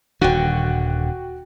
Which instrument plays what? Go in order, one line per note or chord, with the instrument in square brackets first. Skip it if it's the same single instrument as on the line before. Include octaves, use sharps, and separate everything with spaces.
[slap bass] D#1 D3 [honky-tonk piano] F#4 G5